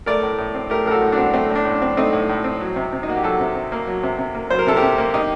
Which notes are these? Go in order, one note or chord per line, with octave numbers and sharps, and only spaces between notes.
A3 A#4 D5
A2
A2
C4
A3 G4 A#4
A2 A#4
F#4 A4
A2
D4 F#4
C4
A3 C4
A2
D4
A2
D4
C4
A3 C4 D#4
A2
A2
C4
F#3
C3
C3
D#4
A#3 F#4
G4
F#3 F#4 A4
C3
C3
A#3
F#3
C3
C3
A#3
F#3 C5
A#4
C3 A4
G4 A#4
C3
A#3
D#3 D#4 G4